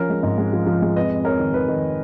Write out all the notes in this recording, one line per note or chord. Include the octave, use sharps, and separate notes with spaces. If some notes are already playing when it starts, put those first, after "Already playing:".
Already playing: F3 C#4 A#4 C#5
G#3
G#2
G#3
F3
F3
G#3
F2 B4 D#5
F2
F2 A#4 C#5
D#3
D#3 B4
D#3